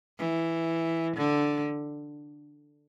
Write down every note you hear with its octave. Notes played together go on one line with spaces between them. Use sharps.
E3
D3